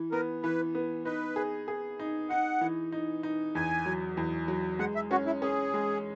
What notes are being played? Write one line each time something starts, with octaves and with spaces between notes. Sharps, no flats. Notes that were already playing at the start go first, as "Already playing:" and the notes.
Already playing: E3
B3 A#4
E3 B4
B3
D#4 B4
G#4
G#4
D#4
D#4 F#5
E3
D#4
D#4
E2 G#5
F#3
E2
F#3
G#3 F#5
E5
C#4 F#4
E4
C#4 G#4
G#3